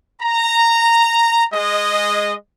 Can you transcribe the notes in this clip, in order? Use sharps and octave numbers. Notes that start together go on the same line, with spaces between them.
A#5
G#3 D#5